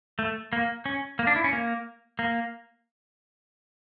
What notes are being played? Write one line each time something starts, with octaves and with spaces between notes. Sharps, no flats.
A3
A#3
C#4
A#3
D4
E4
C#4
A#3
A#3